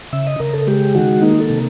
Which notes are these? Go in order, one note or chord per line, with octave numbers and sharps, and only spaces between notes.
C#3 E5
D#5
C#3 A#4
A4
G#3 G4
D#3 F#4
A#3 D#4
A4
C3